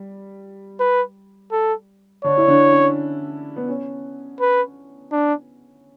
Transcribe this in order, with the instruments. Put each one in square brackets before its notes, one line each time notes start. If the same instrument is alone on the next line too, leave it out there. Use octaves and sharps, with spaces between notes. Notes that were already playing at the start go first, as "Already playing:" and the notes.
Already playing: [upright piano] G3
[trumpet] B4
A4
[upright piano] D3 D4 [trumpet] C#5
[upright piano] E4
D3 D4
C#4
B3
C#4
[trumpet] B4
D4